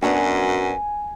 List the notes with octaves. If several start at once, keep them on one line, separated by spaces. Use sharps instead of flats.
F#2 B3 D4 F#4 G#5